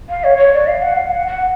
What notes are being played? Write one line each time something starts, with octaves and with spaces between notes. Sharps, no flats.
F5
C#5
C#5
D5
F5
F#5
F5
F#5
F#5